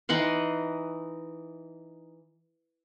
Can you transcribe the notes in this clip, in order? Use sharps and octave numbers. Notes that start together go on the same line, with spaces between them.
E3 D#4 F#5 C6